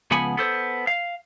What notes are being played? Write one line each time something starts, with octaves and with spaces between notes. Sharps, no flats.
C#2 F3 B3 F#5 G#5 B5
B3 A4 C5
F5